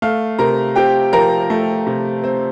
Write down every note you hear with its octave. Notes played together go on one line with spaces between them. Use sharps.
A3 F5 F6
C3 A#4 A#5
C4 G4 G5
F3 A#4 A#5
A3
C3
C4